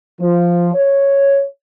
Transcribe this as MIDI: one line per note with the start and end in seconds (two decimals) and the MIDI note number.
0.20 0.71 53
0.75 1.44 73